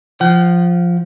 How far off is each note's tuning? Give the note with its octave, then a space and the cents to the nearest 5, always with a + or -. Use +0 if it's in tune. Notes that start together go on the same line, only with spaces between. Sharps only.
F3 +0 F#5 +40